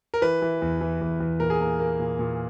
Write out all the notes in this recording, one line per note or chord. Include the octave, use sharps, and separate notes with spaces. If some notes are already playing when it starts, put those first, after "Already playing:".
A#4
E3 B4
E3
E2
E3
E2
E2
A#2 A#4
G#4
A#3 A#4
A#3
A#2
A#2